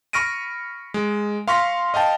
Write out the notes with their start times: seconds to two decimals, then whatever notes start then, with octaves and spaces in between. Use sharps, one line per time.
0.13 B5 C#6 F6 A#6 D7 D#7
0.94 G#3
1.48 F5 C6 C#6 F6 A#6 B6
1.94 D#5 F5 G5 A5